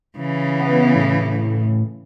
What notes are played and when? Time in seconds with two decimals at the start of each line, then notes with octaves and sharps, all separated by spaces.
0.18 C#3 E3
0.60 B3
0.96 A2